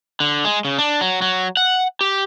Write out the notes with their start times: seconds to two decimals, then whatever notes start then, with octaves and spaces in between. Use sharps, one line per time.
0.20 D3
0.45 G#3
0.65 C#3
0.78 D4
1.01 F#3
1.22 F#3
1.57 F#5
2.01 G4